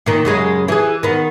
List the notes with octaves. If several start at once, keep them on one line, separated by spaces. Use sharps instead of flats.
A#2 D#3
F#2 C#3 G#3
E3 G#4
D#3 B3